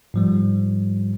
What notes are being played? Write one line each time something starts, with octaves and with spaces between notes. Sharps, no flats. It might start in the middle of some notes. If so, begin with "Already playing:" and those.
G#2 F3 G3